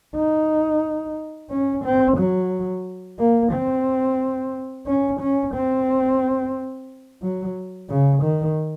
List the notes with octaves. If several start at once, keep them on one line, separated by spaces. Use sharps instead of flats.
D#4
C#4
C4
F#3
A#3
C4
C#4
C#4
C4
F#3
C#3
D#3